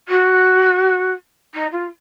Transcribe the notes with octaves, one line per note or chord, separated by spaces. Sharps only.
F#4
D#4
F4